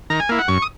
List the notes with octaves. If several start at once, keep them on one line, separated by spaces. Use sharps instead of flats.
D#3 A#5
G#5
A#3 E4
F#5
F#2 C#6
D#6